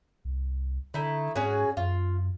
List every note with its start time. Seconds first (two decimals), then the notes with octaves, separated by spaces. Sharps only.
0.25 C2
0.94 D3 A3 D#4 E4
1.36 G#2 C#4 F#4 G#4
1.77 F#2 F4